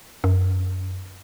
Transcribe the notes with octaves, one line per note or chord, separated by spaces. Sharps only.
F#2